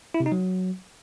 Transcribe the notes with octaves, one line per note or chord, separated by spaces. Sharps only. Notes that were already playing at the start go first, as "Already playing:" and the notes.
E4
C3
D#4
F#3